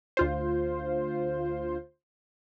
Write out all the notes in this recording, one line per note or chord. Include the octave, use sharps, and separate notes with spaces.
D2 F4 C5